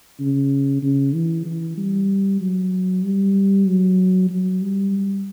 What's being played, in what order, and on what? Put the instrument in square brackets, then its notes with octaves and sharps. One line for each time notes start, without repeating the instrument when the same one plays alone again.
[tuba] C#3
C#3
E3
E3
G3
F#3
G3
F#3
F#3
G3